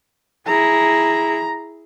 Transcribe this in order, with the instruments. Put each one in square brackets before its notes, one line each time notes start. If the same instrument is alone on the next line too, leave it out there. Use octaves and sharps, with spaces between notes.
[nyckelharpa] E4 G#4 [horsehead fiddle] A#5